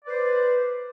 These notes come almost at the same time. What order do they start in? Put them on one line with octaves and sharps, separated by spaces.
D5 B4 C5